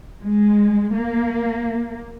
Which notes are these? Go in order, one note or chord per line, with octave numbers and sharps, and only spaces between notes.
G#3
A#3